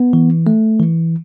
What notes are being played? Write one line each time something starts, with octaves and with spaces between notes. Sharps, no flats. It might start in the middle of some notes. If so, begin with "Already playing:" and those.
Already playing: B3
E3
A3
E3